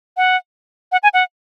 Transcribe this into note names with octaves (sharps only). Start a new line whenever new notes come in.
F#5
F#5
G#5
F#5